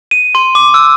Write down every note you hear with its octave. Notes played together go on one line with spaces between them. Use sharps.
D#7
C6
D6
E6